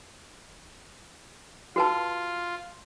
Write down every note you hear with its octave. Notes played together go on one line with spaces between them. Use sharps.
F4 F#4 B4 A5